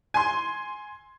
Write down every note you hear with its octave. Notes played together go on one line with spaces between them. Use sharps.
G#5 C6